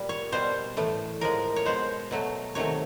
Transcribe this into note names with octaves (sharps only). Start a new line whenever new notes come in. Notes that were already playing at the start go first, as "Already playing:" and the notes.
Already playing: A#2 G3
C#5
B2 G3 C5
A2 E3 A3
A2 F3 G#3 A#4
C#5
B2 G#3 C5
B2 F#3 A3
C3 D#3 F#3 A3 C#5